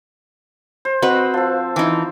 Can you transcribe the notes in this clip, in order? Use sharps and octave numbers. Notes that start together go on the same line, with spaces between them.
C5
C4 F#4 B4 D#5
F3 A4
E3 D#4